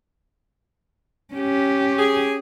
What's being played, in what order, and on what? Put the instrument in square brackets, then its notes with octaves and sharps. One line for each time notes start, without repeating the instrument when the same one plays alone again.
[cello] C#4 G4
[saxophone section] G#4